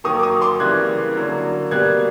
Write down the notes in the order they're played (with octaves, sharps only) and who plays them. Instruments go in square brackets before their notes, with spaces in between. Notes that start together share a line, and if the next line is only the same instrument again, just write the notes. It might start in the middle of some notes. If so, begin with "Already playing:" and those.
[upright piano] D#3 F#3 A#3 C#6 D#6
D6
C#6 D#6
C6 D6
C#3 E3 G3 A#3 F#6 G#6
D3 F#3 A#3
B2 G3 A#3 F#6 G#6